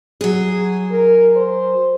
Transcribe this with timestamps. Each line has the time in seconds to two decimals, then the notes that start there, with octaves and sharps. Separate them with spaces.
0.21 F#3 G#4
0.91 A#4
1.36 C5